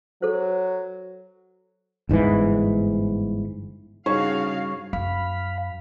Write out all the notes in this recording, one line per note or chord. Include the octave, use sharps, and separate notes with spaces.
F#3 A4 C5
G1 G#2 C3 E3
G2 C#3 D#4 F#4 G#4 C#5 F5
F#2 F5 B5